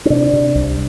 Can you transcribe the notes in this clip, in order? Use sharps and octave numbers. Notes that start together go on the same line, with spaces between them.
C#4
C3 D4
C3
C2